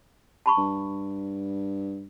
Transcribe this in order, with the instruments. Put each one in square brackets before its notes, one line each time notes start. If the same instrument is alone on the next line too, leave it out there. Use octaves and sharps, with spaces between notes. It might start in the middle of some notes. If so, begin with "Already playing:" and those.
[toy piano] A5 B5 C#6
[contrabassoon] G2